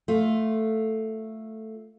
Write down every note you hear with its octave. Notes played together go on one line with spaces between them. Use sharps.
A3 F4